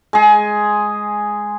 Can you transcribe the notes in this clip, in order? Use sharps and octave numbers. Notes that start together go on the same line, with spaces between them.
G#3 G#4